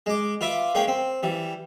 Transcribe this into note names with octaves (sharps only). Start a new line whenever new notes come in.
G#3 D6
F4 B4 E5 D6
G#3 A#3 C#4 G5
C4
E3 G3